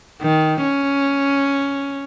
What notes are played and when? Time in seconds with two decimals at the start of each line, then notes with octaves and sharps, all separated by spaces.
0.22 D#3
0.62 C#4